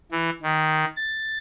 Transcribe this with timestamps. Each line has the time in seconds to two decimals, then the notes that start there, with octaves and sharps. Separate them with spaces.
0.12 E3
0.42 D#3
0.96 A6